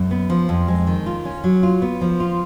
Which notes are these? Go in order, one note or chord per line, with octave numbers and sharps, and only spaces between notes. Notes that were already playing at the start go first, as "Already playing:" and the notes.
Already playing: F#2
B3
F3
F2
G#3
D#3
F4
C#4
F#3
F4
B3
F3
F4